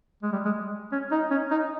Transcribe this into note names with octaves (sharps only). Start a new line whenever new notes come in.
G#3
G3
G#3
C#4
D#4
C#4
D#4